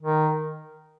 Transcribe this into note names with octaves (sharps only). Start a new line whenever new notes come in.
D#3